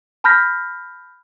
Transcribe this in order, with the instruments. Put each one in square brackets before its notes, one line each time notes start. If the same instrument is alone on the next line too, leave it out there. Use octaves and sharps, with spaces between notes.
[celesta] A5 B5 F6 G6 A#6 B6